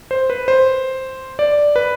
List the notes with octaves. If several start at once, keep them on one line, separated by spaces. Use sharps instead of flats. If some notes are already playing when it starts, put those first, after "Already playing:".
C5
B4
C5
D5
B4